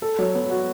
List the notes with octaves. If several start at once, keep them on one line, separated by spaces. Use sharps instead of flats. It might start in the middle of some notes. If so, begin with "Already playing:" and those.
A4
F#3
B3
F#4